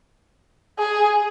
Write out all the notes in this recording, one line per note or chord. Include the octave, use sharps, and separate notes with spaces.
G#4